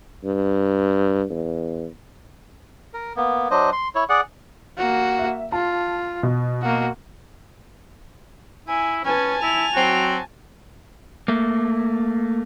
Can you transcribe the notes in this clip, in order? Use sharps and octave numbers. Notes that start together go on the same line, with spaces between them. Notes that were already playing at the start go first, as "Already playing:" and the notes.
G2
E2
A#4
A#3 B3
F#3 D4 C5 D#5
C6
E4 C#5
G#4 D5 F#5
A#3 F#4
E5
F4 A5
B2
A#3 F#4
E4 G#5
C#4 B4 G#5 A5
E4 F7
F#3 C4 F#4
A3 A#3